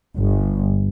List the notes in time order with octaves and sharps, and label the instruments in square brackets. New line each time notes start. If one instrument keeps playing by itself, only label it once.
[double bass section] G1